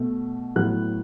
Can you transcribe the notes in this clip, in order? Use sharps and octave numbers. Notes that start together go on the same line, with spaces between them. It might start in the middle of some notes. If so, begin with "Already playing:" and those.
Already playing: B2 A3
A2 F#3 B3 F#6